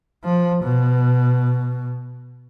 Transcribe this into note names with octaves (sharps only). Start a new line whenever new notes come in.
F3
B2